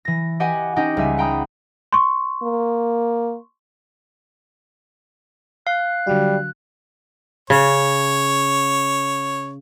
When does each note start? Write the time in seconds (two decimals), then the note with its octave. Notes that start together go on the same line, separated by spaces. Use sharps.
0.05 E3 A#6
0.40 G4 B4 D#5 F#5 G#5
0.76 C#4 D#4 G4 D#5 F#5 G5
0.97 C#2 G3 E5 G#5
1.18 F#5 G5 A#5 B5 D#6
1.93 C6 C#6
2.43 A#3
5.67 F5 F#6
6.07 D3 F#3 G3 F#4
7.50 C#3 C#5